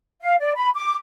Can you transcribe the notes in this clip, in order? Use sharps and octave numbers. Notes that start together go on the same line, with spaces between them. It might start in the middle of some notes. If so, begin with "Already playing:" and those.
F5
D5
B5
D6